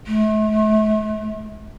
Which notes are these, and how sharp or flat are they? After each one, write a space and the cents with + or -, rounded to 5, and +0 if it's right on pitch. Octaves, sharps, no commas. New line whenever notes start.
A3 -40